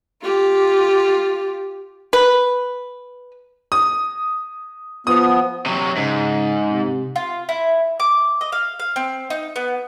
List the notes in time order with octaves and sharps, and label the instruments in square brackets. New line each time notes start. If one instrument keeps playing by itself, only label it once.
[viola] F4 G4
[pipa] B4
[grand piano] D#6
[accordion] F3 B3 [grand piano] D#6
[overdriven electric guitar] C3 F#3
[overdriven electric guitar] G#2 [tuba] C#3
[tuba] C3
[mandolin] F4
E4
D6
D#5
F5
F5
C4
D#4
B3